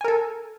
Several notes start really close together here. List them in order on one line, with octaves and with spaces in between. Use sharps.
G#5 A#4 A4